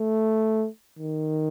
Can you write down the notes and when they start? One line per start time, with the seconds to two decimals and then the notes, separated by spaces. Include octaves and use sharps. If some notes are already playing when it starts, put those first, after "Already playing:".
Already playing: A3
0.99 D#3